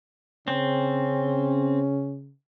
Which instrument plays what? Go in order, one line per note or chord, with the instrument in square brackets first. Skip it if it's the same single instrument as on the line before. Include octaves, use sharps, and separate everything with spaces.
[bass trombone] C#3 [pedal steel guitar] C4 [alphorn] C#4